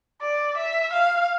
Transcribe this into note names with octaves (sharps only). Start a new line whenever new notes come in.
D5
E5
F5